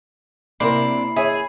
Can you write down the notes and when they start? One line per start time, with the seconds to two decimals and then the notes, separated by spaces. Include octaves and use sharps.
0.60 C3 A#3 D4 E4 A#4 B5 C7
1.16 G#4 C#5 E5